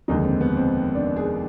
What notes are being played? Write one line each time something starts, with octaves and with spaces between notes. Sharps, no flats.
F1 D#2 D3 G#3 D#4
C4
B3
C4
D4
G#4